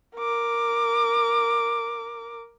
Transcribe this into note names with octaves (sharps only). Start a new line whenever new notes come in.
A#4 D6